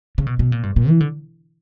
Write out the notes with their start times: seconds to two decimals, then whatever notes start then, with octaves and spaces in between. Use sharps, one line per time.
0.18 C#3
0.26 B2
0.39 B2
0.52 A#2
0.63 G2
0.76 A#2
0.89 E3
1.00 D3